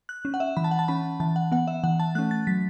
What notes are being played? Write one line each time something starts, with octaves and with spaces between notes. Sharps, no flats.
F#6
C#4
F#5
E5
E3 B5
A5
F#5
A5
C#4 B5
E3 A5
F#5
B3 F#5
E5
E3 F#5
A5
A3 C#4 F#6
A6
F#3 B6